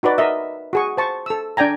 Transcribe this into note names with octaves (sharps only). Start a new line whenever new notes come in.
D#4 F#4 B4 D5
A#4 D#5 E5
F#4 G#4 C#6
C5 A5 C#6
A4 E6
D4 D5 G5 G#5 A#5